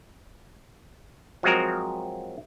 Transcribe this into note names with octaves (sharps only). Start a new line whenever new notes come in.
F3 F#3 G#3 C4 F#4 A#4